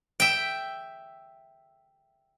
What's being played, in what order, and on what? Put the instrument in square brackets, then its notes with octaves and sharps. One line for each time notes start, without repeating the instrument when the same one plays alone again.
[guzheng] E5 G5